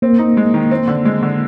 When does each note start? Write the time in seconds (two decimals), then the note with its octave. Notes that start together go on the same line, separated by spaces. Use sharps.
0.02 A#3 C4
0.19 D#4
0.37 G#3
0.54 D#3
0.71 C4
0.88 D3
1.05 G#3
1.23 D3